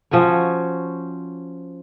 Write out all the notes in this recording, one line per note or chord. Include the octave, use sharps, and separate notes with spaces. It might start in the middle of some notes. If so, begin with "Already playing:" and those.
F3 C#4 F#4 C#5